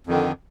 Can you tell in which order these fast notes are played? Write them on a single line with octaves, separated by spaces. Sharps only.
F2 D#3 D3